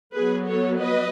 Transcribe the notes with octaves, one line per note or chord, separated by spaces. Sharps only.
F#3 B3 G#4 B4
A4 C#5
B4 D#5